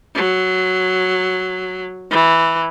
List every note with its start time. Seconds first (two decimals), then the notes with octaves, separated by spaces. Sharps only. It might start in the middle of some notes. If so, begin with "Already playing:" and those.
0.15 F#3
2.11 E3